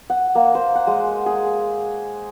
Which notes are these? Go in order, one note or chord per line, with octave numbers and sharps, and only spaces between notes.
F#5
A#3
C5
F#5
G#3
G#4